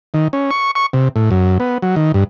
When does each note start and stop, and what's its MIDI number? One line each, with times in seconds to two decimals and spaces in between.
0.14 0.28 51
0.33 0.51 61
0.51 0.71 85
0.75 0.86 85
0.93 1.08 48
1.16 1.30 45
1.31 1.58 42
1.60 1.78 59
1.82 1.95 54
1.96 2.12 51
2.14 2.24 43